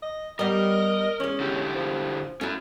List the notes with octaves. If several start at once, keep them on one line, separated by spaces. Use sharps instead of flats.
D#5
G3 B3 A#4 D#5
E2 G#3 C#4
D3 E4 G4
F3
A3 C#4 E4 F#4